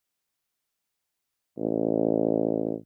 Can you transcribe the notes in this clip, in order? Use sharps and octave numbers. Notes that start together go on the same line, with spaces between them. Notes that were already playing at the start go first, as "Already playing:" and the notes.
A1